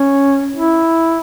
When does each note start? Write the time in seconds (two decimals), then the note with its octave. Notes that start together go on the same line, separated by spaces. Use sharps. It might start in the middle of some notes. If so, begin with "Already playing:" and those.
Already playing: C#4
0.56 E4